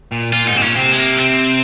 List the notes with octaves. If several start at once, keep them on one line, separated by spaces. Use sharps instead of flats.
A#2
A#2 F4
G#2 D#4
C3 C4
A#2 C#4
C3 C4
G#3
A#3
C4